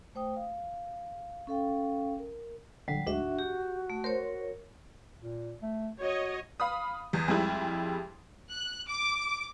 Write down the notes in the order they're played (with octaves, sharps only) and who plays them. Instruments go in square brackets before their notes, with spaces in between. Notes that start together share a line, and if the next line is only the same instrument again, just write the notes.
[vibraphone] A3 C5 G5 D#6
F5
C#4 A4 F5 G5
A#4
[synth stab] A#1 D3 [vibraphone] F#3 G3
[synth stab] D2 G#2 [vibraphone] D4 E5 [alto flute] F#4
[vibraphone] G4
A3
[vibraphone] A#4 C#5 [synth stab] C5
[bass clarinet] A#2
A3
[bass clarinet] F#4 [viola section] C#5 D#5
[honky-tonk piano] F5 B5 D#6
E2
F2 G3 G#3 E4
[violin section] F#6
D6